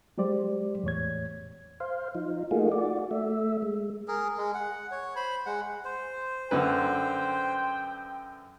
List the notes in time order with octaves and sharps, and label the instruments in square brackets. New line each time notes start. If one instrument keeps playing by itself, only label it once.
[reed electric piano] F#3 G#3 G4 C5 D5
E2 A2 C#5 G#6
[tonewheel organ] C5 F5
F3 D#4
A3 A#3 D#4 F4 F#4 G#4
F#4 D5
A3 E5
G#3
[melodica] G#4 A#4
G#3
F#5
C#5
C5 B5
G#3 F#5
C5
[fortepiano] F#2 D3 B4 [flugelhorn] G5